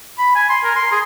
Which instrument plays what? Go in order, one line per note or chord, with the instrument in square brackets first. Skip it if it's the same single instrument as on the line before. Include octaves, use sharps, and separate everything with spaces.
[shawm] B5
G#5
C6
A#4
C6
G#4